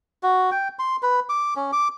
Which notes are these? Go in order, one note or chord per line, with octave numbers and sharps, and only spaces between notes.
F#4
G5
C6
B4
D6
C#4
D6